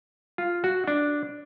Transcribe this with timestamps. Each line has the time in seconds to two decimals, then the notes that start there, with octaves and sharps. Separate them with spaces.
0.38 F4
0.64 F#4
0.88 D4